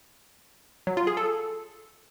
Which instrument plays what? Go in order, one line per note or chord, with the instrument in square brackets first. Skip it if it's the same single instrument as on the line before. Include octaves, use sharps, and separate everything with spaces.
[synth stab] F#3
F4
G#4
A4